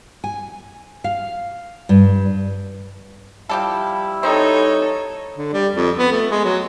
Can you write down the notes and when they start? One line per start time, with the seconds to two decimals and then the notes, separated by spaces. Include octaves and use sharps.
0.24 G#5
1.04 F5
1.89 G2
3.49 F3 G3 E4 G4 A4
4.23 C4 D#4 A4 C#5
5.37 D3
5.53 G3
5.75 F2
5.98 B3
6.12 A3
6.31 G#3
6.45 F#3